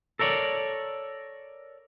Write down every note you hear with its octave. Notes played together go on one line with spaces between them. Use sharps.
A4 A#4 C#5 D5